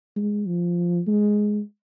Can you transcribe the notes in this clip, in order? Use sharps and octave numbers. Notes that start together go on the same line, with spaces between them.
G#3
F3
G#3